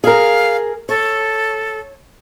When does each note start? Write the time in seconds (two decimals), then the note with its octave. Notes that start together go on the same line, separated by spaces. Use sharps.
0.04 G#4 A#4 F5
0.89 A4 C#5